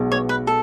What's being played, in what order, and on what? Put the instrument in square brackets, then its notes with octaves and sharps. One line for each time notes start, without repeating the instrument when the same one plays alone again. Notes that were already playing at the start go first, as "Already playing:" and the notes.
Already playing: [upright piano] B1 B2 G#3
[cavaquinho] C#5
B4
A4